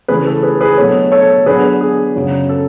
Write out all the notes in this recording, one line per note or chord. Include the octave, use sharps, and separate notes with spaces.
C#3 E3 A3 G#4 B4
A4
G#4 B4
G#4 B4
B2 F#3 A3 D4 A4 C#5
A4 C#5
D3 F#3 B3 D4 G#4 B4
G#4
F#2 C#3 F#3
A4